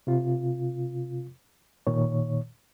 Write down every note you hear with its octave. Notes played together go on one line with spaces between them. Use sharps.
C3 F4
A#2 D#3 C#5